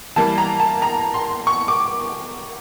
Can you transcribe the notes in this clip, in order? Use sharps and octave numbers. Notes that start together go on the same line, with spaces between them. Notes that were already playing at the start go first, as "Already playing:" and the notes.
E3 G3 A#3 A5
A#5
A5
A#5
C6
C#6
D6